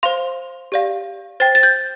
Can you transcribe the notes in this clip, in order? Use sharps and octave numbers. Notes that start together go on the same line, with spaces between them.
C5 F5 C6
G4 D5 F5
C5 G5 A6
A6
G6